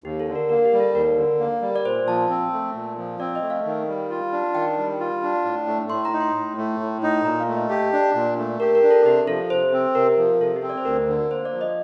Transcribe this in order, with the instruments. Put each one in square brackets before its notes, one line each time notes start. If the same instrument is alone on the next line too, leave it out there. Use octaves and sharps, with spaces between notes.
[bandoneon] D#2 [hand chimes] G4
[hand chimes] A4
[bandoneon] D3
[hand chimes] A#4
[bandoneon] A#3 [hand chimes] A#4
[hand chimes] G4
[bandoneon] G3
[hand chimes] A4
[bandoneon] D#2 [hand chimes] A#4
[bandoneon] D3
A#3
G3
[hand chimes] D5
[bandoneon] A#2 [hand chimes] C5
[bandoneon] F3 [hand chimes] A5
[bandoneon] C4
A3
A#2
F3
[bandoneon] C4 [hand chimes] D5
[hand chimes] D#5
[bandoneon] A3
[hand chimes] F5
[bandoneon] D#3
G3
F4
D4
[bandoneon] D#3 [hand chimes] G5
[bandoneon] G3
F4
D4
A2
A3
[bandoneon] A2 [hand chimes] C6
[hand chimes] A#5
[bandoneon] D#4
[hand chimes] C6
[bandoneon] A2
A3
A2
D#4
[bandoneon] A#2 [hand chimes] A#5
[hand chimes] F5
[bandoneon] A3
[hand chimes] D#5
[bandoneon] G4 [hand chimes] A5
[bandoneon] D4
A#2
A3
[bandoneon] G4 [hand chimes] A#4
[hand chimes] A#4
[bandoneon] D4
[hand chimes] A4
[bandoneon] C3 [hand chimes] G4
[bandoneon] F3 [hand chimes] A4
[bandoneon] C3 [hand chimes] C5
[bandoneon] C4
[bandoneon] C3 [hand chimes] A#4
[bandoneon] F3
[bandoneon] C3 [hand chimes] A4
[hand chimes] G4
[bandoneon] C4
[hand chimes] D5
C5
[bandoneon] D2 [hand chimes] A#4
[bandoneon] D3
[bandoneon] A#3 [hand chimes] C5
[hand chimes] D5
[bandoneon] F3
[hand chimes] D#5